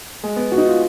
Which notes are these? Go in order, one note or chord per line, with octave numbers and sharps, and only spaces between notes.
G#3
B3
F#4
D#4
F4